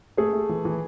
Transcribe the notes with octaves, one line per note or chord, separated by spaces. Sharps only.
A3 G#4
A3
E3
E3